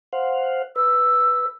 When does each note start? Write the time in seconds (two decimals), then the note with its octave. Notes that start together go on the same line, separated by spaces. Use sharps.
0.13 C5 F5 F#5
0.76 B4 E6